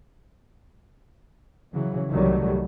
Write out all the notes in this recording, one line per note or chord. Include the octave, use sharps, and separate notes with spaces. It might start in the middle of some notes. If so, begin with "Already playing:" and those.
C#3 E3 F#3
C2 D#3 F#3 G3 A3